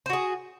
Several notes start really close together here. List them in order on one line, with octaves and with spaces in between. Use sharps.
C5 F#4 G#4